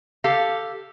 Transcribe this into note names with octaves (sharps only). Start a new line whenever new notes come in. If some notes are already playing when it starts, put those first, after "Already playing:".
G4 A4 F5